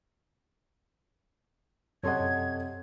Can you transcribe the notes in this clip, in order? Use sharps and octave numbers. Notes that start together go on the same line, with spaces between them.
F#2 C3 A4 C#5 D#5 F#5 C6 G#6